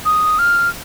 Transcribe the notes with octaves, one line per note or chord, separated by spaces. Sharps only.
D#6
F6